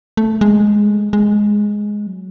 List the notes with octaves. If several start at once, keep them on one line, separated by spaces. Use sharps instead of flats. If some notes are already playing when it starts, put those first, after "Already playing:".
A3
G#3
G#3
F#3